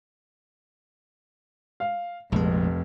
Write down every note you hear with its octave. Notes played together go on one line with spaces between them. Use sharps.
F5
F1 A#1 F2 G#3